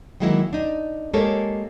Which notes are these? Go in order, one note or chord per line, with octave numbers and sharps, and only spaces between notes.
D#3 E3 F#3 G#3 A#3 E4
D4 D#4
G#3 A#3 G4 A4 A#4 C#5